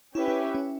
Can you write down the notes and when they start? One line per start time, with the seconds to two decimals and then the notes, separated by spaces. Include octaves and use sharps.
0.15 C#4 E4 G4 B4 E5
0.28 E4
0.55 C#4